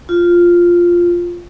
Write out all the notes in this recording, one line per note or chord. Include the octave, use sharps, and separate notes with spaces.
F4